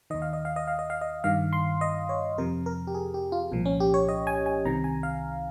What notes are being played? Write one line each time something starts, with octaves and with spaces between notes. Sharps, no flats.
D#2 D#3 D#5
F5
D#5
F5
D#5
F5
D#5
F5
D#5
G2 D#3 F5
C6
D#5
C#5
F2 C3 F3 A#4
A#4
G4
G#4
G4
F4
C2 A#2 F3
C#4
G4
C#5
D#5
G#5
G#5
C2 C3 D#3 A#5
G#5
F5